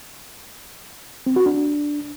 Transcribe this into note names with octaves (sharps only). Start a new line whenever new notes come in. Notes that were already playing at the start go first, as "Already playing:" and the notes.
C4
F#4
D4